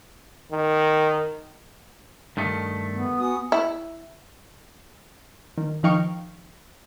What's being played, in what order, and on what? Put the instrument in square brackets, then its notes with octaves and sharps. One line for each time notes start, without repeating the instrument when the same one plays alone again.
[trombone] D#3
[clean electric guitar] G2 D#3 A3
[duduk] B3
[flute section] F#4 G#5 D#6
[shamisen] E4
[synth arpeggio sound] D#3
D#3 F3 D#4 F5 G5 C#6